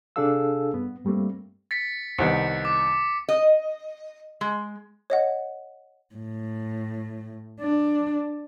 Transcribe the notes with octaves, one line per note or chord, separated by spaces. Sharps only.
C3 D4 G#4 A4 F5 E6
G2 B3
G2 G3 A3 A#3 C4
A6 B6 C#7
C2 D#3 B3 C#7
D6
D#5
G#3
C#5 D#5 F#5
A2
D4